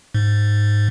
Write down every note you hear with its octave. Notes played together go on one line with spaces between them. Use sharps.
G#2